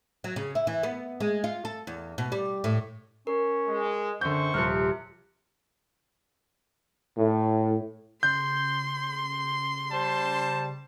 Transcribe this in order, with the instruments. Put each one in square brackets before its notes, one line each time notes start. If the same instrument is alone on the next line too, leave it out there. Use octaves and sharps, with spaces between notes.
[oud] F#3
C#3
E4
E3
B3
G#3
F4
A4
E2
B2
G3
A2
[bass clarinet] C#4 [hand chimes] A#4
[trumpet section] G#3
[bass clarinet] F#2 [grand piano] D3 G6 [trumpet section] C4 C5 C#6
[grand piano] D#1 F3 [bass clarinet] C3 [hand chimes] F6 F#6 C#7
[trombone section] A2
[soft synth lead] C#3 [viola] C6 [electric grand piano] G6
[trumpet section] G3 C5 A5